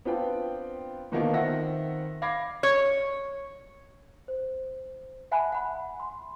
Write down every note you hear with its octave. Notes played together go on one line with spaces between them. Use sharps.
B3 C4 D4 F4 B4 G5
B2 D3 D#3 F3 A#3 B3
D#3 C4 E5 F#5 A#6
F5 B5 D6 G#6 A#6 C7
C#5
C5
E5 F#5 G#5 A5 B5 F#6
F#5 B5
C6